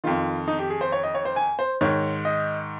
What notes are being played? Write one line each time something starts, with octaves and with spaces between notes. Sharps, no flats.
F2 D#3 F4
D#4
G4
G#4
C5
C#5
D#5
C#5
C5
G#5
C5
G#2 D#3 C#5
D#5